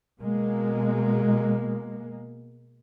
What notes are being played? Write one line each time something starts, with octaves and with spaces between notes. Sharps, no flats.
B2 G#3 A#3